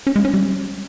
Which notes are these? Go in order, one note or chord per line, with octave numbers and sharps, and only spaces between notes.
C#4
G#3
C#4
G3